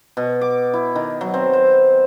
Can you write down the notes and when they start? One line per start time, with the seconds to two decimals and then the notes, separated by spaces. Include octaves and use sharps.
0.17 B2
0.41 D6
0.74 E4
0.95 D#3
1.21 F#3
1.34 C4
1.53 C5